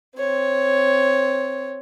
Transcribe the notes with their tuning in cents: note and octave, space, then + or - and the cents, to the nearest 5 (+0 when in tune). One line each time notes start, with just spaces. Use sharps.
C4 +0 C#5 +0